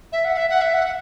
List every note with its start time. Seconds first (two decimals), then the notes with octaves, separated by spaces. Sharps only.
0.12 E5
0.25 F#5
0.37 E5
0.49 F#5
0.61 E5
0.74 F#5
0.86 F#5